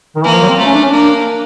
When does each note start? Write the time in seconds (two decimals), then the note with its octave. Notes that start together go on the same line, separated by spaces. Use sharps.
0.16 D#3
0.24 E3 A#3
0.32 F3
0.41 F#3
0.49 C4
0.58 A3
0.66 C#4
0.74 D4
0.82 C#4
0.90 A#3 D4